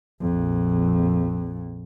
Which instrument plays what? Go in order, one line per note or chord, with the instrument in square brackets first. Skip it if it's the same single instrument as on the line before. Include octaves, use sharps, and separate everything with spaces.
[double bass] A#1 F2